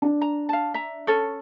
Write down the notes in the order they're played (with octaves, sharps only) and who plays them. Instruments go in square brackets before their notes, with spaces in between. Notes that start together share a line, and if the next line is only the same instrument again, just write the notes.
[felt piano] D4
[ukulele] A#5
F5 A5
E5 A#5
C#4 A4 C#5